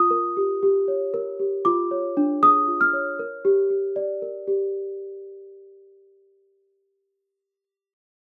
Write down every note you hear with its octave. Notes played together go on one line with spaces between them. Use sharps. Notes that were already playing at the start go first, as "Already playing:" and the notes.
Already playing: F4 D#6
A#4
G4
G4
C#5
A#4
G4
F4 D6
C#5
D4
G#4 D#6
F4
F6
C#5
A#4
G4
G4
D5
A#4
G4